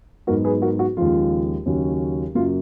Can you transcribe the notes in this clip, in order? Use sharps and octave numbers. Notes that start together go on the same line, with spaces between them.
G#2 F#3 B3 D#4 F#4 A#4
G#4 B4
F#4 A#4
F#4
D#2 C#3 F3 G#3 F4
D#2 C#3 F#3 C#4
F#2 C#3 F#3 A#3 F4